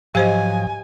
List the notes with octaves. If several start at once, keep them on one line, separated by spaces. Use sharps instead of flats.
G#2 F3 F#3 G4 C5 D#5 F5 G#5